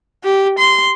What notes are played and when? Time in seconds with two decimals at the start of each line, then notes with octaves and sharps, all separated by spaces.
0.24 G4
0.58 C6